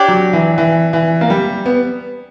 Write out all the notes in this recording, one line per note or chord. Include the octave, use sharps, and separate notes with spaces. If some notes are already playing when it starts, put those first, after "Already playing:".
Already playing: D4 G4 C#5
F#3
E3
E3
E3
A#3
G3
B3